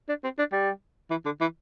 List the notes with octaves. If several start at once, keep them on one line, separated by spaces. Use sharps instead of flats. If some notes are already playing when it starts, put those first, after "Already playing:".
D4
C4
D4
G3
E3
D3
E3